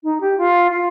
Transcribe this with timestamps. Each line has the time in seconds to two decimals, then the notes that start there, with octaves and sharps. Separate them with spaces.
0.03 D#4
0.21 G4
0.38 F4
0.72 F4